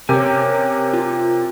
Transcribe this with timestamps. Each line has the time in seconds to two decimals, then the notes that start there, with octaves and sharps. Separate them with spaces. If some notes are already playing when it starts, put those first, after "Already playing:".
0.09 C3 G4 A#4 C#5 G#5
0.93 F4